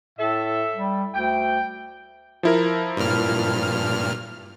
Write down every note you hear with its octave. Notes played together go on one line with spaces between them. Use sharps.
A2 A4 E5
G3
D2 G5
F3 E4 A#4
G2 A#2 F6